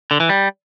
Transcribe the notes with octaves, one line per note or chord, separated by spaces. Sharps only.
D3
E3
G3